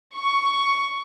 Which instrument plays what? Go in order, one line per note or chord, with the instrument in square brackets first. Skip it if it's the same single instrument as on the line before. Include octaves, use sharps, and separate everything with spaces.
[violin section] C#6